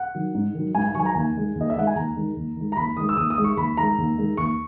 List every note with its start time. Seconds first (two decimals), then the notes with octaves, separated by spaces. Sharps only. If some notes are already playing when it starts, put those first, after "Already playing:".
Already playing: F#5
0.15 D#3 F#3
0.34 G#2
0.54 D#3 F#3
0.74 G#2 G#5
0.85 G#5
0.95 D#3 F#3 C#6
1.00 G#5
1.05 A#5
1.15 D#2 G#5
1.35 D#3 G#3
1.55 D#2
1.61 D#5
1.70 E5
1.76 D#3 G#3 F#5
1.87 G#5
1.96 D#2 A#5
2.16 D#3 G#3
2.36 D#2
2.56 D#3 G#3
2.72 A#5
2.76 D#2 B5
2.97 D#3 G#3 D#6
3.09 E6
3.17 D#2 D#6
3.30 D#6
3.37 D#3 G#3
3.44 C#6
3.57 D#2 B5
3.77 D#3 G#3 A#5
3.98 D#2
4.18 D#3 G#3
4.37 D#2 C#6